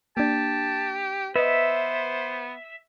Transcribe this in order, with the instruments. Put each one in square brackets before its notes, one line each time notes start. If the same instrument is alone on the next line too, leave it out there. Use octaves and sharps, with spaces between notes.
[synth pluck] A#3 D4 [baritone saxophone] G4 [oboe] A5
[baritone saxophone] B3 [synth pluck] B4 D#5 [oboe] C5 [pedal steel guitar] E5